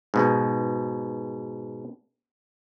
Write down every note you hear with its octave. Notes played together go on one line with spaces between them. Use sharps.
G#2 B2